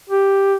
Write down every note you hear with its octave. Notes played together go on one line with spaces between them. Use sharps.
G4